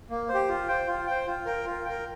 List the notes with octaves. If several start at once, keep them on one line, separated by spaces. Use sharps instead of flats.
A#3
C5
G4
F4
C5 G5
F4
C5 G5
F4
A#4 G5
F4
A#4 G5